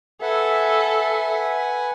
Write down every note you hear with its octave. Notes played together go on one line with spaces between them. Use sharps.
A4 B4 E5 F#5 G#5